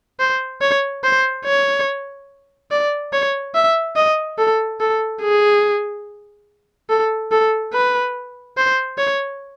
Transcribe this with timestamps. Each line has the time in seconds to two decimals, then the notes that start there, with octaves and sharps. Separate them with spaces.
0.20 C5
0.61 C#5
1.04 C5
1.45 C#5
2.71 D5
3.13 C#5
3.55 E5
3.96 D#5
4.38 A4
4.81 A4
5.22 G#4
6.90 A4
7.32 A4
7.73 B4
8.57 C5
8.98 C#5